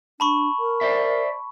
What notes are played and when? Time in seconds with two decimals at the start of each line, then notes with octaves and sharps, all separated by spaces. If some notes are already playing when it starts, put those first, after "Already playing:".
0.20 D4 A5 B5 C#6
0.59 A#4
0.81 C5 D5 E5